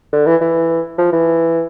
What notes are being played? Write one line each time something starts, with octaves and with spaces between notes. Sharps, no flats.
D3
E3
E3
F3
E3